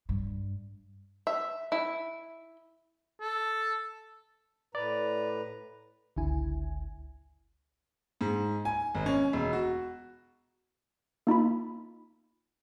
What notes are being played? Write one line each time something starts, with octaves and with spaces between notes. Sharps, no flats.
G2
E5
E4
A4
A2 B4 D5 A#5
G1 C#2 D3 E4 G#5
G#2
G#5
G#1
C#4
E1
F#4
A#3 D#4 F4 B5